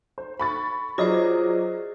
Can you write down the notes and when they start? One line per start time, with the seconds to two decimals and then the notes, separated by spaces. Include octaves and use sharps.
0.18 C5
0.39 B5 C#6 A6
0.98 F#3 F4 G#4 C5 D5 D#5